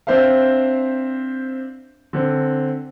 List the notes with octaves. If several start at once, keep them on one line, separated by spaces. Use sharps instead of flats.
C4 D4 C5 E5 F5
D3 C4